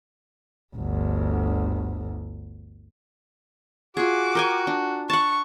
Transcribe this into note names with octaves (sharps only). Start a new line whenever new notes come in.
G1 D2
F4 F#4 G#4 D6
A#4 G5 G#5
D4
F#5 A5 C#6